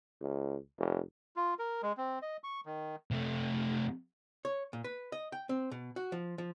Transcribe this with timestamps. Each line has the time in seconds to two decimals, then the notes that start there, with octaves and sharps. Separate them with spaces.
0.21 C#2
0.79 F1
1.36 F4
1.59 A#4
1.83 G#3
1.97 C4
2.22 D#5
2.44 C#6
2.66 D#3
3.11 C3 A3
4.45 C#5
4.73 A#2
4.84 B4
5.12 D#5
5.32 G5
5.49 C4
5.71 B2
5.96 F#4
6.12 F3
6.38 F3